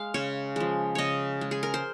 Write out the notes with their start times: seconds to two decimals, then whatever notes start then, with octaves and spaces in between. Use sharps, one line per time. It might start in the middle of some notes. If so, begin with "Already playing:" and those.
Already playing: G#3 F5
0.14 C#3 C#5
0.56 F3 G#3
0.95 C#3 C#5 D#5
1.41 G#3
1.51 G#4
1.63 A#4
1.74 C5